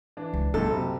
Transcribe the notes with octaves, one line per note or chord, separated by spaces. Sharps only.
E3 D4
C#2
C#2 A#2 C#3 F#3 A4
F#1 C3